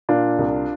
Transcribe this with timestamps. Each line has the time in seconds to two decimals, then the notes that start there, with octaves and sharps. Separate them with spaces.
0.09 A#2 D4 F4
0.39 C2